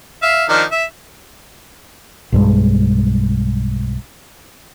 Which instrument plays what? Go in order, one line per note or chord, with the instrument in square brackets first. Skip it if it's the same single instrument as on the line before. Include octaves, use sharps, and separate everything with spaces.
[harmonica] E5 F5
D#3 F3 D4
E5
[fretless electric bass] B1 G2 G#3